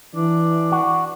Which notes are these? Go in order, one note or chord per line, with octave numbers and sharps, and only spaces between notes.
E3 D4
F#4